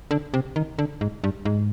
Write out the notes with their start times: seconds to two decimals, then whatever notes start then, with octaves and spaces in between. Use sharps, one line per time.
0.11 D3
0.34 C3
0.56 D#3
0.79 D3
1.01 G#2
1.24 G2
1.45 G#2